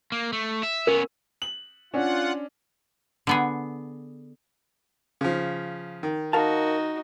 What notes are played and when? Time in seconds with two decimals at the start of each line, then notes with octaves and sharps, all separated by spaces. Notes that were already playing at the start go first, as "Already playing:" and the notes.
0.12 A#3
0.33 A3
0.63 E5
0.87 B3 C#4 A#4
1.42 F#7
1.94 C#4 D4 F4 F#5
3.27 D3 B3 G#4
5.21 C#3 F3
6.03 D#3
6.33 D#4 F#4 A#4 F5 A5